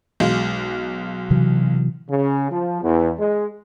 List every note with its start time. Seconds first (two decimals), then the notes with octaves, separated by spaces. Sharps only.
0.20 B1 G#3 F5
1.31 C3 E3 F#3
2.09 C#3
2.50 F3
2.82 E2
3.18 G#3